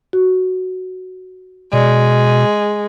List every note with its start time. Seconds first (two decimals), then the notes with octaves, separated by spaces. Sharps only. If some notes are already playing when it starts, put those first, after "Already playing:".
0.13 F#4
1.73 B2 G#3 D5